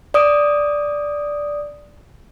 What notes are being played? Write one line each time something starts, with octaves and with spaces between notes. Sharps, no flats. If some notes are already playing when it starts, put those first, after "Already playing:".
D5 D#6 D7